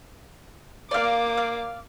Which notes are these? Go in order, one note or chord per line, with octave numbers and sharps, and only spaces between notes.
A#3 D5 F5 D6
D5 F5